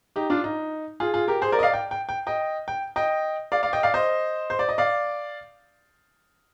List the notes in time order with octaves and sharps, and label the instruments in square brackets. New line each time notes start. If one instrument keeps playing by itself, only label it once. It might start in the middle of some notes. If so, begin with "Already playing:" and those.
[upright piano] D#4 G4
D4 F4
D#4
F4 G#4
F4 G#4
G4 A#4
G#4 C5
A#4 D5
D#5
D5 F5
G5
G5
G5
D#5 G5
G5
D#5 G5
D5 F5
D5 F5
D#5 G5
D5 F5
C5 D#5
C5
D5
D#5
D5 F5